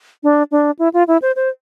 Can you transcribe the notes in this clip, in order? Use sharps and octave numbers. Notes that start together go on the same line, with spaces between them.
D4
D4
E4
F4
E4
C5
C5